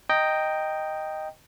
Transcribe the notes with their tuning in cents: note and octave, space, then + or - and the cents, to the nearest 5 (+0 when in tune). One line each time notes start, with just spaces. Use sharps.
D#5 +0 G5 +0 A#5 -20